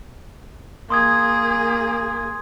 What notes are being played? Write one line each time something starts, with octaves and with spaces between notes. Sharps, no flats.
A#3 G#4 C6 D#6 G#6